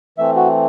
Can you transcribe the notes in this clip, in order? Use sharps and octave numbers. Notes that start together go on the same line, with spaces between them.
E3 A3 C4 E5
F#4